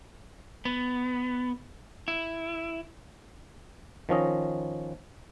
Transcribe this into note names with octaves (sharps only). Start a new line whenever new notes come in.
B3
E4
D#3 F3 C#4 D#5